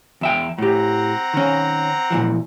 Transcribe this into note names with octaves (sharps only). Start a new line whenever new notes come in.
E2 E5 G5
A2 C4 G4 F#5 A#5
D#3 C#4
A#2 E3 F3